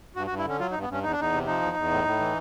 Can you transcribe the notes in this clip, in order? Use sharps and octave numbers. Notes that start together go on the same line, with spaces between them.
G2 F#4
F#4
G2
E4
D3 C#4
F#3 F4
D#4
G2
B3
G2 C#4
E2 D#4
D4
E2 D#4
C3
F3 D#4
E2
E2
A2
A2
E3